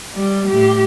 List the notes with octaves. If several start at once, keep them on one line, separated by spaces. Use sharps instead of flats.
G3
A2 G4